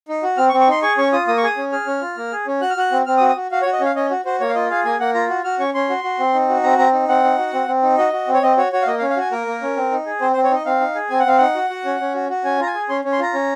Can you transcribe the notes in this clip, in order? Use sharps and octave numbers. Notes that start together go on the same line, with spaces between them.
D#4
F#4
C4 F6
C#6
C4
C#6
D#4 C6
G#4 C#6
C#4 C#6
F4 D#6
A#3 D#6
C#6
G#4 D#6
C#4
G#4 F6
C#4
F4
A#3
G#4
C#4
F#4 F#6
F6
F#4 F#6
C4
C4 F6
D#6
F#4
D#6
F#4
F#4 F5
C#5
F#4
D#5
C#4 F5
C#4 D#5
F#4
F#4 C5
A#3 C#5
F5
F4 D#5
G#4 F5
A#3 G#5
A#3 F#5
F4 A#5
F#4
F#4 F6
C#4 C#6
C#4 C6
F#4
F#4
C4
D#4
F#4
C4 A#5
C4 A#5
D#4
C4 F#5
D#4
F#4
C4
C4
D#4
F#4 D#5
F#4
C4
C#5
C4 D#5
F#4 C#5
F#4 C#5
F5
A#3 D#5
F5
C#4
F5
F#4 G#5
A#3 A#4
A#3
C#4
C4
D#4
G#4
C4 C5
C5
C4
C#5
D#4 D#5
C4 F5
D#4
G#4
C4 G#5
F#5
C4 F5
D#4 F#5
F#4
F#4
C#4
C#4
F#4
F#4
C#4 G#5
F4 A#5
G#5
G#4
C#4 C6
C#4
C6
F4 A#5
C#4